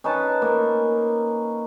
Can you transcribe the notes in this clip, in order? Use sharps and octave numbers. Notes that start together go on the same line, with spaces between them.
C#4 D#4 B4 A5
A#3 A#4